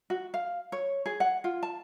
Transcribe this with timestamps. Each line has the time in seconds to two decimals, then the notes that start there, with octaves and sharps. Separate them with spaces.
0.10 F#4
0.34 F5
0.72 C#5
1.06 G#4
1.20 F#5
1.44 F4
1.63 A5